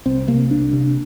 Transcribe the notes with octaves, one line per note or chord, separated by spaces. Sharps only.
C2 C4
C3 A#3
C2 D4
C3